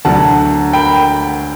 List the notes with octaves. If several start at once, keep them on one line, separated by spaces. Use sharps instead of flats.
D2 D3 F#3 F#5 A5
G5 B5